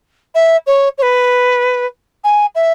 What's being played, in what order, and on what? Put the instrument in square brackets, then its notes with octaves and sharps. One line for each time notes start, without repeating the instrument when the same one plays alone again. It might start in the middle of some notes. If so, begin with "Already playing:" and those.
[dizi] E5
C#5
C#5
B4
G#5
E5